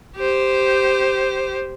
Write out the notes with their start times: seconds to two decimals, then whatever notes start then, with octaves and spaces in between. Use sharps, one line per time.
0.17 G4 C5